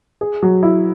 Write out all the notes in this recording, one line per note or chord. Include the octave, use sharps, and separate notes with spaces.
G#4
F#3
E4